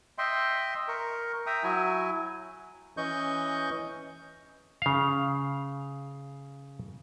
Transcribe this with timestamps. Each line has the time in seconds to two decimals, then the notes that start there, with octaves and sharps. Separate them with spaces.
0.18 D#5 E5 G5 C6
0.88 A#4 C#6
1.46 E5 G5 A#5 D#6
1.63 F#3 E4 G#5
2.97 E3 C#4 D#5 C#6 G6
4.82 C#3 F5